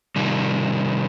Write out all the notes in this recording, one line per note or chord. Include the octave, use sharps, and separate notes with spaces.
C3 D#3 G3